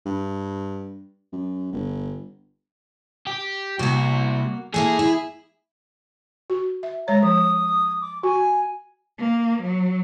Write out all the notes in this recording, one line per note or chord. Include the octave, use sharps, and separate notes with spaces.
G2
F#2
G1
G4
C2 A#3 F#4
A3 A#3 E4 G#4
E4
F#4
E5
G#3 C#5 A#5
F3 D#6
D6
F#4 G#5
A#3
F#3